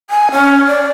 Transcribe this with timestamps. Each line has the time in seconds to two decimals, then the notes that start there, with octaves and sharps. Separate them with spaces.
0.10 G#5
0.32 C#4
0.67 D5